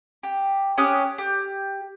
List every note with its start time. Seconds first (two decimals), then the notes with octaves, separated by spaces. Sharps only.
0.23 G4
0.78 C#4 G4 D#6 F#6
1.18 G4